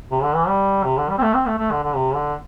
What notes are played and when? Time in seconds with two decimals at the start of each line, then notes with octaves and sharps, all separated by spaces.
0.11 C3
0.23 D3
0.35 E3
0.48 G3
0.84 C3
0.98 D3
1.10 G3
1.18 C4
1.22 A3
1.34 C4
1.47 A3
1.59 A3
1.71 D3
1.84 D3
1.96 C3
2.15 D3